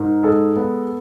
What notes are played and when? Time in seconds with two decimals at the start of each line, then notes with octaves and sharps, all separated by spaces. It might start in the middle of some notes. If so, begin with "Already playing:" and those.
Already playing: G#2 A#4
0.23 G#3 A4
0.56 B3